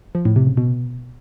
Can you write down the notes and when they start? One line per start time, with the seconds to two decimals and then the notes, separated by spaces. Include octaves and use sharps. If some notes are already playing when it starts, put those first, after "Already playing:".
0.15 F3
0.25 A2
0.36 C3
0.47 C#3
0.57 B2